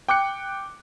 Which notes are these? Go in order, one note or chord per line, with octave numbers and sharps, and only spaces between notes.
G5 D6 F#6 C#7